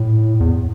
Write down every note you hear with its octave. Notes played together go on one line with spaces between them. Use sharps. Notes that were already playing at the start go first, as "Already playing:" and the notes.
Already playing: A2
E2